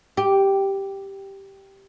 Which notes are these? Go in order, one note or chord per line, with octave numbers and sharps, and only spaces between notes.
G4